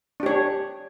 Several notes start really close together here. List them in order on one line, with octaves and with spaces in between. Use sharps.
D4 G4 C#5